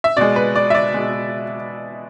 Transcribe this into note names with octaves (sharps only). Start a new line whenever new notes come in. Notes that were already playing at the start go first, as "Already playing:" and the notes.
E5
B2 G#3 D5
B4
D5
E5
D5
B2 G#3